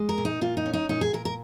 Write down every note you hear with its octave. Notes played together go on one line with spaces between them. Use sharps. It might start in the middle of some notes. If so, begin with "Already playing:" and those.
Already playing: G#3
A#4
A#2
D#4
A#2 F4
D#4
C#4
D#4
A#2 D#4
G#4
A#2 A#4
A#4